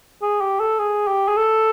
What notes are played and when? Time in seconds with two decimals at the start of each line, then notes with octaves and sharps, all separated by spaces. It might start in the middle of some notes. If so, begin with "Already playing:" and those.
0.22 G#4
0.41 G4
0.60 A4
0.79 G#4
1.08 G4
1.28 G#4
1.37 A4